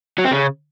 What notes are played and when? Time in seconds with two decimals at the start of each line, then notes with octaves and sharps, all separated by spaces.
0.18 F#3
0.25 C4
0.32 C#3